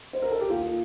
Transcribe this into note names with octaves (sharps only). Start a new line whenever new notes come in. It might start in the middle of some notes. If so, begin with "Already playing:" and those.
C5
A#4
A4
G4
D#2 F4